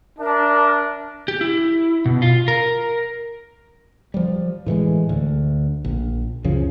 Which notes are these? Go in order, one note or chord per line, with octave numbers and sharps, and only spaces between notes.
D4 A#4 E5 A5
G4
E4
B2
F4
A#4
F3 G3
A2 E3 G3 G#3
D2
A#1
C#2 F#2 C#3 F3